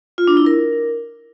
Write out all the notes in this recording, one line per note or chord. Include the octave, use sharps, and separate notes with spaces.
F4
D4
E4
A#4